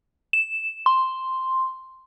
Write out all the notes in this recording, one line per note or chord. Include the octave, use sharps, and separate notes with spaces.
E7
C6